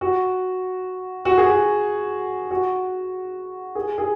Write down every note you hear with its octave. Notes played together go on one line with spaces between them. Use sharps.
F#4
F#4
G#4
F#4
F#4
G#4
G#4